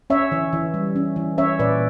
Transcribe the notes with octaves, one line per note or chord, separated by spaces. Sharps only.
C#4 C#5 E5
E3
E3
G3
C#4
E3
C#4 C#5 E5
A#2 B4 D5